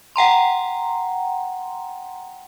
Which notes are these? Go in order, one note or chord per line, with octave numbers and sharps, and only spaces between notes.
F#5 G5 A#5 C6